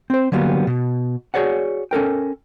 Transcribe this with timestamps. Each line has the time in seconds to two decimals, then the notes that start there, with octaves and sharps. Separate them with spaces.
0.10 C4 C5
0.32 D3 F#3 G3 A#3 B3
0.67 B2
1.34 F#4 G#4 C#5 D5 F#5
1.91 C#4 A4 A#4 G5